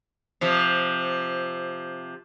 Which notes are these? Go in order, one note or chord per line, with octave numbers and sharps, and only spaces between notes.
C3 F3